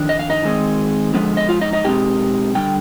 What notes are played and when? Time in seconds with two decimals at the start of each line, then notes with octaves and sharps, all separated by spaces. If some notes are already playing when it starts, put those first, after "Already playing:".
Already playing: F2 D#3 D4
0.09 D#5
0.19 F5
0.30 D#4 D#5
0.44 D#3 G#3 C4 D#4
1.14 D3 F3 G#3 B3
1.37 D#5
1.49 F4 F5
1.61 D#4 D#5
1.73 D#4 D#5
1.85 B2 G#3 C4 D#4 G4 G5
2.55 D3 G3 G5